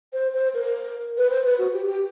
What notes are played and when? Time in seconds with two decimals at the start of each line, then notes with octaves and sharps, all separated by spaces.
0.13 C5
0.34 C5
0.54 A#4
1.17 B4
1.31 C5
1.44 B4
1.58 F#4
1.73 G4
1.86 G4